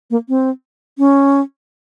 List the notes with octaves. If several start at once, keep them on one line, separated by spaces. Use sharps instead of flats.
A#3
C4
C#4